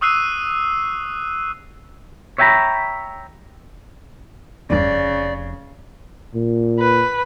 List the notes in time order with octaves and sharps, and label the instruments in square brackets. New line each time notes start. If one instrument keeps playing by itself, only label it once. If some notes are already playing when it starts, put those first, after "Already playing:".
[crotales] C#6 D#6 E6 F#6 C7 D#7
[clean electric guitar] C#5 E5 G5 G#5 A#5 B5
[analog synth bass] F1 [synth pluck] E2 G2 [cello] C#3 [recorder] D5
[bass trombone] A#2
[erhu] B4